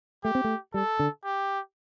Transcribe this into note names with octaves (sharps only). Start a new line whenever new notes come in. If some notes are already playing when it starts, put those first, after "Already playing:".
A3 G4
C4
A3
G3 A4
D3
G4